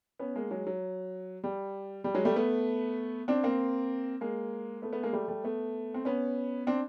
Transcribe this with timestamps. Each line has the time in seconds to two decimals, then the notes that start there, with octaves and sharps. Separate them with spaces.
0.19 B3 C#4
0.36 G#3 A#3
0.51 F#3 G#3
0.67 F#3
1.44 G3
2.04 G3
2.15 F#3 G#3
2.25 G3 A3
2.36 A3 B3
3.28 C4 D4
3.43 A#3 C4
4.21 G#3 A#3
4.82 A3 B3
4.93 A3 B3
5.03 G#3 A#3
5.13 G3 A3
5.28 G3 A3
5.44 A3 B3
5.94 C4
6.05 B3 C#4
6.67 C4 D4